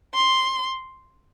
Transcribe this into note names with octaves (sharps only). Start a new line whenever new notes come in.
C6